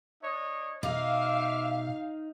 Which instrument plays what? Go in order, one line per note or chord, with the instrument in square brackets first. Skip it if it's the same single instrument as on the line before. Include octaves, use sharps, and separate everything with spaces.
[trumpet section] D4 C#5 D#5
[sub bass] B2 [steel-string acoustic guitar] D#4 [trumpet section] E5 D6 [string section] F5